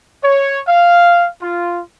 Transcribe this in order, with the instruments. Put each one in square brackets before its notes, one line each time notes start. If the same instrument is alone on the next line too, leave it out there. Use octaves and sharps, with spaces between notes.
[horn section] C#5
F5
F4